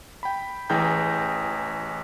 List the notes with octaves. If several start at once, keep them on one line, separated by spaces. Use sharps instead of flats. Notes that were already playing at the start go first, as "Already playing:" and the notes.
G5 B5
A1 E3 G#4 G5 A#5 G6